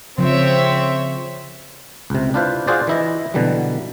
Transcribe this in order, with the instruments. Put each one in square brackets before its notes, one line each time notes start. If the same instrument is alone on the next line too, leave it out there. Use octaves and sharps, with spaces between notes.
[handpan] C#3 F3 [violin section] C4 C#5 E5
[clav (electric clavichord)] C#2 C3
D4 E4 F4 B4 C5
F4 F#4 G#4 C5 D5
E3 E4 D#5
B2 D3 E3 F#3 G3